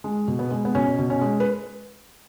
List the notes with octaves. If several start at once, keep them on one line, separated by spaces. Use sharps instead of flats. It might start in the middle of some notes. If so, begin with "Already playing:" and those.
G#3
B2
B3
G#3
B3
B2 C#4
B2
C#4
G#3
B4